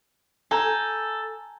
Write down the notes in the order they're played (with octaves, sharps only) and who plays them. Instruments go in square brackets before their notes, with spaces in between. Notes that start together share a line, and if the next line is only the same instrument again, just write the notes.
[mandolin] A4 [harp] G#5 A#5 G6